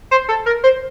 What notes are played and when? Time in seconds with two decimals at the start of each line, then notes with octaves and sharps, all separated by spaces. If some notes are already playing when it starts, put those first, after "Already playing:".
0.11 C5
0.28 A4
0.46 A#4
0.64 C5